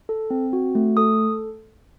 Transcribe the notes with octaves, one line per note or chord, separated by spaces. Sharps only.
A4
C4
F#4
A3
A4 D#6